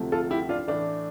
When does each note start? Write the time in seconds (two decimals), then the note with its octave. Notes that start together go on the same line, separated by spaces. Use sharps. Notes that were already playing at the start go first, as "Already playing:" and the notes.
Already playing: D2 C3 F3 A3
0.12 F4 A4
0.30 E4 G4
0.49 D4 F4
0.68 A2 E3 A3 D4